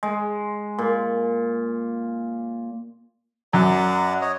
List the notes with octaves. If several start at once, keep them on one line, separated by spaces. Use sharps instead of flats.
G#3
A#2
F#2 D5 F#5 A#5
C#5 D#5